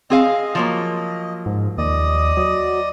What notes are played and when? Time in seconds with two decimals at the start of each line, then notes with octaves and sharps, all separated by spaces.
0.10 C4 G#4 D#5 F5
0.55 F3 F#3 A#3
1.46 G#2
1.78 D#2 D5 D#5 D#6
2.37 F#3